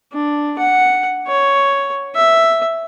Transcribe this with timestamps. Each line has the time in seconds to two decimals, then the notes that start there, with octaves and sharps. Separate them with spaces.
0.13 D4
0.58 F#5
1.27 C#5
2.15 E5